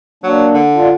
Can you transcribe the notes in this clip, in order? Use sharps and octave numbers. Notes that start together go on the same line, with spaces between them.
F#3 A#3 D4
D3
D4 F4